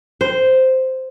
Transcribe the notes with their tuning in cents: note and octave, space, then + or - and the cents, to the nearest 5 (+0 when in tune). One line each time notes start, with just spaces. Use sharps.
C5 -5